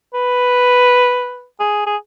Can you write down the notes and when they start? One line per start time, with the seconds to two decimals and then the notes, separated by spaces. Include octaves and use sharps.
0.14 B4
1.60 G#4
1.86 G#4